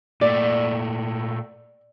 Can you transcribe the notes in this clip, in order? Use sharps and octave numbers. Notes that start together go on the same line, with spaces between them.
A#2 A3 D5